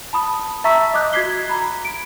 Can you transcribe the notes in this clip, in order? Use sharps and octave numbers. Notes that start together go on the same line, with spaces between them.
A5 B5 D#6
E5 A5 A#5 C#6 E6 B6
D#5 D6 D#6 F#6 G6 B6
F#4 G#6 B6 C7 G7
A#5 B5
D7